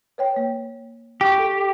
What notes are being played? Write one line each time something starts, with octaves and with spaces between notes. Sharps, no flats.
B4 C#5 G5
A#3
G4 G5 C#6
A4